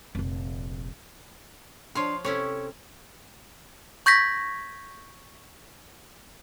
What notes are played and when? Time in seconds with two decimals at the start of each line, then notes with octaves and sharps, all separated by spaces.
0.15 F1 A#1
1.95 F3 D4 C#5 F5 C6
2.25 C3 C#4 E4 A4 C#5
4.06 C#6 G6 G#6 A#6 B6